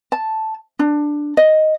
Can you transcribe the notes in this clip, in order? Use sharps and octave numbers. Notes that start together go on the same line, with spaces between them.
A5
D4
D#5